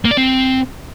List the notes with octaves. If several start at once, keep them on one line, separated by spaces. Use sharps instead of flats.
A#3
D5
C4